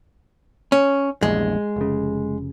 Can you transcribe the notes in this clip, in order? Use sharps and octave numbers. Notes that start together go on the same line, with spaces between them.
C#4
A#1 E2 G2 G#3
F1 C#3